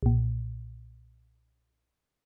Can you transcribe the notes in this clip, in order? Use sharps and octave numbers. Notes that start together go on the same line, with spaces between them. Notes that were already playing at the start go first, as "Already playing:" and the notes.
B1 A#2